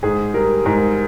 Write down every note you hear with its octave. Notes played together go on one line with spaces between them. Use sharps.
G#2 G#4
G3 A#4
G#2 A#4